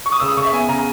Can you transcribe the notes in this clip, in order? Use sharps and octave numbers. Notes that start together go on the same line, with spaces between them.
C#6
D#6
C#3 E6
D#6
C#3 C#6
E5
B3 G#5
C#3 A#5